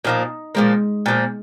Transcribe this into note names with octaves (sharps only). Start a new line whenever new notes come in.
A#2 F3 A#3 D#4
A#2 F3 G#3 A#3
A#2 F3 A#3